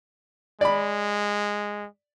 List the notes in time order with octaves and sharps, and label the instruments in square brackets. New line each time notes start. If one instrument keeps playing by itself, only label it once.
[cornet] G#3 [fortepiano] D5 B5